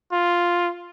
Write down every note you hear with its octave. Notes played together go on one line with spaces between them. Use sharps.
F4